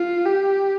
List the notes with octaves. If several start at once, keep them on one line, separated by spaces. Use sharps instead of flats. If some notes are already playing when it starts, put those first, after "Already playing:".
Already playing: F4
G4